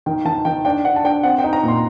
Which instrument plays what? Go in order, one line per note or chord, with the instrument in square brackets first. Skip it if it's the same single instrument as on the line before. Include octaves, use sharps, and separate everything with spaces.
[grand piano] D#3 G5
D#3 A5
D#3 G5
D4 G5
D4 F#5
A5
D4 G5
C4 F#5
G5
D#4
A#5
A#2 C6